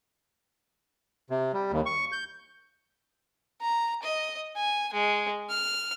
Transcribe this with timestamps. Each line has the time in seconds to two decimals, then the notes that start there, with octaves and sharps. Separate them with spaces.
1.30 C3
1.54 G3
1.72 D#2
1.86 C#6
2.12 G6
3.61 A#5
4.03 D#5
4.56 G#5
4.93 G#3
5.50 F6